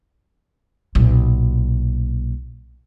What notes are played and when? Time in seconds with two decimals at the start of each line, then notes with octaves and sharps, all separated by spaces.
0.95 B1 A#2